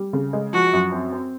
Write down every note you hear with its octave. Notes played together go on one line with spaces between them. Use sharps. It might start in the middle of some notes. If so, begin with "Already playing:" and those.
Already playing: G3
C#3
G#3
F3 F#4
F#2
C4
C4